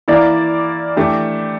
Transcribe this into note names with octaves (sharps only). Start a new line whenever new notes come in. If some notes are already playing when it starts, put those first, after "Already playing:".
E3 A#3 E4 A#4 D5
E3 A3 D4 G4